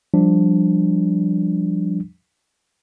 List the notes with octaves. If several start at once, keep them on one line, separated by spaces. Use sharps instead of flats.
F3 G3 D4